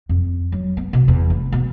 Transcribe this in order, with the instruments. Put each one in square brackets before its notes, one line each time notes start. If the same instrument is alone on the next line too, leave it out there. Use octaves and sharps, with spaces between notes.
[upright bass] F2
F#3
B3
B2
E2
F1
B2